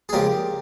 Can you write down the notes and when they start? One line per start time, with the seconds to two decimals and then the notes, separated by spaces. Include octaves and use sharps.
0.09 G#4
0.13 C#2 C#3 F3 G4 A#4